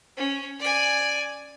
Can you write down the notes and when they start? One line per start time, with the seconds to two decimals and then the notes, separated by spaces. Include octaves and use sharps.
0.17 C#4
0.60 D5 G#5